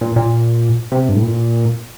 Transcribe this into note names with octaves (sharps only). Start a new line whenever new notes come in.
A#2
A#2
C3
G2
A2
A#2